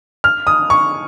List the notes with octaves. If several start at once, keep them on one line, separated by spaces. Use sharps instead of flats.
F6
D#6
C#6